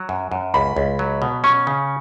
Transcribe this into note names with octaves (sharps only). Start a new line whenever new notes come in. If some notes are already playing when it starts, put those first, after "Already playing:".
Already playing: F#3
F#2
F#2
C#2 B5
C#2
F#3
B2
C#4 C#6
C#3